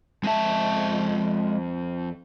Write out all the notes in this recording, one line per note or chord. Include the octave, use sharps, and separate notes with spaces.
F2 G#3 E5 A5